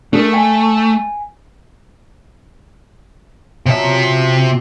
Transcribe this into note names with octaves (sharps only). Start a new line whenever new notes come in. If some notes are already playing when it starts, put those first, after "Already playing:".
A3 D4 G#4 A#4
E5 G5 G#5
C3 F3 F#3 C#4 E5